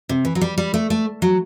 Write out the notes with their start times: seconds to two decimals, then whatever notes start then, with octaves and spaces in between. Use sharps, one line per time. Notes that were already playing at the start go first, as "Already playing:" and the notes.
0.09 C3
0.25 E3
0.35 F#3
0.41 G3
0.58 G3
0.74 A3
0.90 A3
1.22 F#3